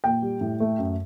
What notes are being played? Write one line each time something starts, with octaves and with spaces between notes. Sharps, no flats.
A#2 G5
G3
A2
A3
F#2